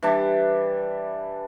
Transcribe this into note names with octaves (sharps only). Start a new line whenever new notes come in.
E3 G3 D4